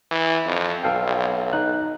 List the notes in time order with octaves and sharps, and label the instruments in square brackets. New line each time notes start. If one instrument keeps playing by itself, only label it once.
[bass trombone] E3
F2
[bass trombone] B1 [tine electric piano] A4 F5 G5
[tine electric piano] D#4 F#6